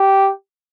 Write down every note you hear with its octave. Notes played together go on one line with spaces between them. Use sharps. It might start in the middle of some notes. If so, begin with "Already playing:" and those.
Already playing: G4